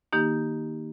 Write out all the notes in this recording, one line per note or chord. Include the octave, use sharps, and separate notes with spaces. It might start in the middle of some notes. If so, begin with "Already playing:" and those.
D#3 A#3 D#4 G4